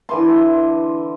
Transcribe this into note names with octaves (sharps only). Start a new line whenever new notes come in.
D3 E3 C6